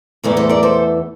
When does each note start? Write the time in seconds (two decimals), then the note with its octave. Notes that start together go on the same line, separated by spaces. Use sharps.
0.24 E2 E3 A3 A#4 D5
0.37 A4 C5
0.49 A#4 D5
0.63 A4 C5